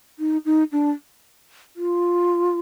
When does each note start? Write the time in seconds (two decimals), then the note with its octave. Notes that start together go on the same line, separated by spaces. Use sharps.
0.19 D#4
0.45 D#4
0.72 D4
1.76 F4